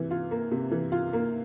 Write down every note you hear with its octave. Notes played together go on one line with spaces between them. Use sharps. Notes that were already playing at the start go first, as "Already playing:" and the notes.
Already playing: C3 E3
F4
A#3
C3
E3
F4
A#3